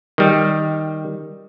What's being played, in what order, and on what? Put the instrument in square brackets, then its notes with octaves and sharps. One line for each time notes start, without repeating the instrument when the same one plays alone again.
[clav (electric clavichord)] D#3 G3